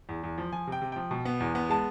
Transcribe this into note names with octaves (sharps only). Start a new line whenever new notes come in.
E2
E2
F3
F3 G#5
C3 G5
C3
F3 G5
B2
B3
E2
B3
G#3 A5